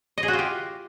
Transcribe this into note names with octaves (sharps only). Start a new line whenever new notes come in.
D#5
G#4
F#4
F4
G4